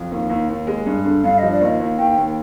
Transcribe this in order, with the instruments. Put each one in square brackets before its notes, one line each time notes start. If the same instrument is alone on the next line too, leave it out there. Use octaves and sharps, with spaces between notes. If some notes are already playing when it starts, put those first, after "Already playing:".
Already playing: [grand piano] F2
D#2
D#2
D#2
G#3
G2
D3
[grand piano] G2 [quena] F5
[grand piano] F3 [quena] D#5
[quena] D5
[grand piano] D#2 [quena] D#5
[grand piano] D#2
[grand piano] D#2 [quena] G5
[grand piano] D#2